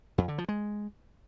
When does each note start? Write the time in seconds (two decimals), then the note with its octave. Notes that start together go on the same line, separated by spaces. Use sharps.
0.18 F2
0.28 D3
0.38 F3
0.49 G#3